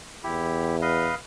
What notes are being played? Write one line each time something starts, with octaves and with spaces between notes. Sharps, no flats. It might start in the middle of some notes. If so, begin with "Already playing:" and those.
E2 E4 G4
B4 D#5 F5